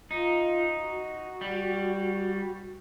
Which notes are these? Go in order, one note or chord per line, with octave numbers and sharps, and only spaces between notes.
D#4 F4
F#4
G3